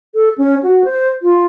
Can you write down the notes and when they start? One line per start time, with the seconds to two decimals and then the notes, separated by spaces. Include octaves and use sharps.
0.14 A4
0.38 C#4
0.63 F#4
0.84 C5
1.22 F4